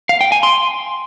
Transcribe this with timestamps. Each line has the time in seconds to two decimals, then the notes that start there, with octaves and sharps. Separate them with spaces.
0.09 F5
0.21 G5
0.32 G#5
0.43 C6